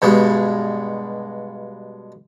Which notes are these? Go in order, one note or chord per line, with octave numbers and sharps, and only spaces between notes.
G2 B2 G#3